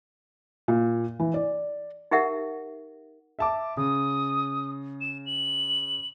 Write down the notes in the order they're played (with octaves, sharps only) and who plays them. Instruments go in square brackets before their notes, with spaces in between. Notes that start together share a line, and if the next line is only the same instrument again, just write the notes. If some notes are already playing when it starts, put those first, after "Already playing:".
[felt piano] A#2
E3
D5
[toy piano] D#4 G4 A#4 E5 F#5
[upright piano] E5 A5 D6
[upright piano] C#3 [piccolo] D#6
[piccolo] E7
F#7